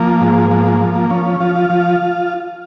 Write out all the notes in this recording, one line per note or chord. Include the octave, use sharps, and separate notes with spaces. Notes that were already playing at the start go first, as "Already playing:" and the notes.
Already playing: F3 A#3
G#2
F3 A#3
A#3
F3
A#3
F3 C#4
C#4
F3 F4
F4
F3